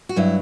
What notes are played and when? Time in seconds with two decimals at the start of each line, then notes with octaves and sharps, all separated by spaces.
0.09 F#4
0.16 G2 F#3 E4